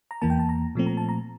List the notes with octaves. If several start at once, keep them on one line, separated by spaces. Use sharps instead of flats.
A#5
E2 E3 A#3 A5
G5
A5
A#5
A#2 F3 A3 C4
A#5
A5
A#5